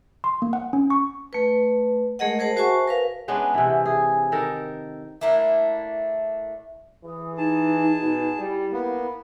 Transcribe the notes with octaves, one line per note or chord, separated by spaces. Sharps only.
C6
A#3
F#5
C#4
C#6
A3 B4
G#3 A3 G#4 A#4 D#5 F#5
G#4 A#4 C5 F#5 A5
F#4 C5 E5 G#5 A5 C#6
A#4 B4 F5
G#3 B3 C#4 D4
C3 E3
G#4
D#3 A4 A#4
A3 A#3 D4 E4
E3 G#4
D#4 G#4 A5
B2
G3 E4
A#3 B3